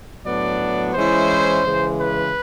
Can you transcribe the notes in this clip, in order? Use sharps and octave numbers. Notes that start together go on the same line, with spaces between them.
A2 F#3 B3 D4 D5
E3 G#3 C#4 E4 C5
C#3 E3 G#3
B4